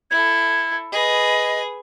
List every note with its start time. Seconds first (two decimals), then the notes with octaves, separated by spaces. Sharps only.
0.11 E4 A4 G#6
0.92 G#4 B4 D#5